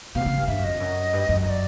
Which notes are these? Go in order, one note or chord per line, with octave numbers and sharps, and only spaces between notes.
B2 F5
C3
C#3
G2
G2 E5
F#2
D#5
F2
F#2
G2
F#2
D#5
D5